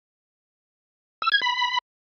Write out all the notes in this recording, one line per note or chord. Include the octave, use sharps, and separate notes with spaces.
E6
G#6
B5